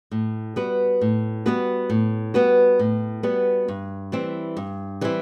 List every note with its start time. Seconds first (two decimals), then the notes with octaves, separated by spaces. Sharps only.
0.11 A2
0.56 G3 B3 F#4 B4
1.01 A2
1.46 G3 B3 F#4 B4
1.90 A2
2.34 G3 B3 F#4 B4
2.79 A2
3.23 G3 B3 F#4 B4
3.68 G2
4.12 E3 G3 C4 E4
4.57 G2
5.01 E3 G3 C4 E4